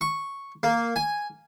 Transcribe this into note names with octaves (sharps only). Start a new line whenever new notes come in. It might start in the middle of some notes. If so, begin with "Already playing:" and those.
C#6
A#3
G#5